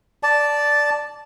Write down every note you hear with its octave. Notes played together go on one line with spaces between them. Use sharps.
D5 A5